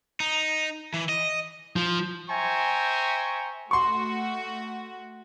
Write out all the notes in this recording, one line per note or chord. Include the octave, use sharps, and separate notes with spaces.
D#4
E3
D#5
F3
C5 E5 G5 G#5 A#5 C#6
A3 F#4 C6 C#6